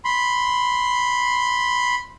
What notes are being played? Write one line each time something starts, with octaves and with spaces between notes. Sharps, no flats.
B5 C6